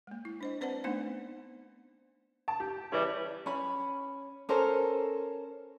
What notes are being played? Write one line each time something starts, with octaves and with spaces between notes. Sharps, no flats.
G#3 A#3
E4
D4 C5 D#5
C4 B4 C5 D5 F#5 A5
A3 B3 D4 D#4 C5 F#5
A5
G4
C#3 E3 G3 C#5
C#4 B5
C#4 A4 A#4 C5